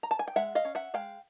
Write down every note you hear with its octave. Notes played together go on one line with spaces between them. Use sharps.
A#5
A5
G#5
G5
G#3 E5 F#5
D#5 F5
C#4
E5 F#5
G#3 F5 G5